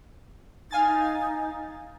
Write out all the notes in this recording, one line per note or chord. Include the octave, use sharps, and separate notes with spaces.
D#4 F5 G#5 A6